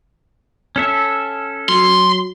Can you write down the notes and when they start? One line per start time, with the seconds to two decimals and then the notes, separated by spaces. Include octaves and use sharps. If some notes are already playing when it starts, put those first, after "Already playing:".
0.76 C#4 A4 E5
1.69 F#3 C6